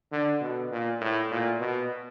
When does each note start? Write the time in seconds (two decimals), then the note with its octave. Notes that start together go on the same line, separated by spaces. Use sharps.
0.12 D3
0.41 B2
0.72 A#2
1.01 A2
1.31 A#2
1.60 B2